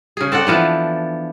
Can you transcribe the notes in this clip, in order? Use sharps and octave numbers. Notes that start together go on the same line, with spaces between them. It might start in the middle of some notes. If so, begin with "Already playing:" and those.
C#3 G#4
C4 A4 D5 F#5
E3 F3 B3 D4